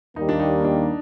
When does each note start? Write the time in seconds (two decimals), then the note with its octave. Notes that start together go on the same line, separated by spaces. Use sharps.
0.16 D#2 D#3 G3 A#3 D#4
0.29 D4
0.40 D#4
0.64 D4